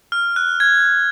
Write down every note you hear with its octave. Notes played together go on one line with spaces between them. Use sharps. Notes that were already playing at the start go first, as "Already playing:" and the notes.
F6
F#6
G#6